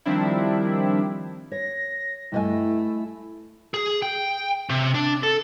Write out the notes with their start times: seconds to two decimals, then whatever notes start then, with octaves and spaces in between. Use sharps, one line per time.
0.05 D#3 F3 G3 C4 D4 E4
1.52 C#5 A#6
2.32 G2 A3 E4 D#5 G#5
3.74 G#4
4.02 G5
4.70 C3
4.94 D4
5.23 A4